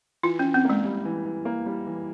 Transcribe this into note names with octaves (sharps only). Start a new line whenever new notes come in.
E3 F4
E3 C#4
C4
G#3 A#3
G3
E3
E3
A#3
G3
E3